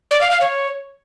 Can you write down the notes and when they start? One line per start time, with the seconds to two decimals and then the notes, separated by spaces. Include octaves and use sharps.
0.11 D5
0.21 F5
0.31 F5
0.41 C#5